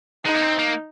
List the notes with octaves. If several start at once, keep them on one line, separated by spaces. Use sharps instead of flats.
G#3 D#4
A#3
C4
A#3